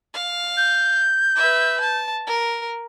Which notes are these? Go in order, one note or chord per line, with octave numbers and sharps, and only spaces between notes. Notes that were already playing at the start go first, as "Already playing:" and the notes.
F5
G6
B4 E5
A5
A#4